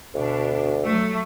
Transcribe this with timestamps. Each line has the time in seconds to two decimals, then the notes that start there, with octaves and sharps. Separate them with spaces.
0.14 D2 B2 D4
0.85 F#3 A3